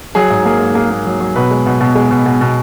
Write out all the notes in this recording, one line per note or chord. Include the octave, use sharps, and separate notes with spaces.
F#3 G#4
G#2
A#3 G#4
G#2
A#3 G#4
A#3
F#3
F#3
B2 B4
G#3
B2
B2
G#3
B2
B2
B2